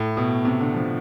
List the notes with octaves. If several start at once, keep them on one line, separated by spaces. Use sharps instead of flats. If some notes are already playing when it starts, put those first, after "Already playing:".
Already playing: A2
B2
C3
D3
F3